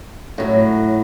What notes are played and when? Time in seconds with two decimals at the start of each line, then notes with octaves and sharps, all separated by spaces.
0.38 A2 F#3